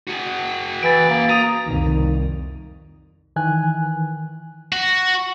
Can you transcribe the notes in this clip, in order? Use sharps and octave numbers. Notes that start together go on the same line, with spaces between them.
F#4 G#4
E3 A6 D7
A#3
A#5 D#6 D#7
C2 F2 D#3
D#3 E3 G#5 F#6
F#4